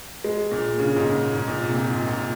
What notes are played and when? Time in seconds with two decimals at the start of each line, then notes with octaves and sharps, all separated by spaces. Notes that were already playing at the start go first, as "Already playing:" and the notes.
0.24 G#3
0.52 A#2
0.80 C#3
0.96 G#2
1.07 A#2
1.34 G#2
1.48 A#2
1.61 C3
1.75 A#2
1.90 G#2
2.07 A#2